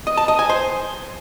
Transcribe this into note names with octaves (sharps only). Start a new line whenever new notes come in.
D#5
A5
D#5
G#5
C5